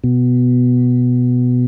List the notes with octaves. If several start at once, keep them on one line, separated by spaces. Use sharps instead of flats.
B2